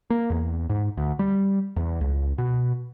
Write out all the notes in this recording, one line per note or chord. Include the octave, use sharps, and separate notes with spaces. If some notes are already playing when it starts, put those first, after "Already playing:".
A#3
E2
G#2
D2
G3
E2
C#2
B2